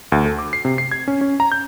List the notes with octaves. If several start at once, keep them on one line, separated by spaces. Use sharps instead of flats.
D2
A4
D6
C7
C3
C7
G#6
C#4
C#4
A#5
G6